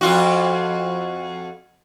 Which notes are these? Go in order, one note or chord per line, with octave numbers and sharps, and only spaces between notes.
F2 F4 F#4